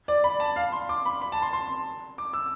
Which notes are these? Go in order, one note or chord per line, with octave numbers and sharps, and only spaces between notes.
D5
B5
A5
F5
C6
D6
B5
B5
A5
C6
C6
D6
E6